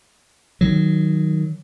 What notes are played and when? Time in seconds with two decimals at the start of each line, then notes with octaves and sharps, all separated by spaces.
0.61 D#3 F#3